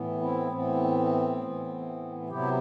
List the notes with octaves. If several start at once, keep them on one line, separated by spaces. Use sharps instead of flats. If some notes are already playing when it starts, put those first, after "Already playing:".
Already playing: A2 E3 B3
C4 E4
A2 E3 B3 C4
A2 E3 B3
C3 F#3 B3 E4 G4